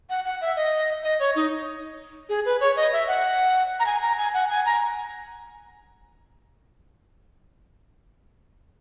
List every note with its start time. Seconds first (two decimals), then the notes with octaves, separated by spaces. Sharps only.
0.10 F#5
0.25 F#5
0.41 E5
0.57 D#5
1.03 D#5
1.20 C#5
1.36 D#4
2.29 G#4
2.46 B4
2.60 C#5
2.76 D#5
2.93 E5
3.08 F#5
3.80 A#5
3.86 G#5
4.02 A#5
4.18 G#5
4.34 F#5
4.50 G#5
4.66 A#5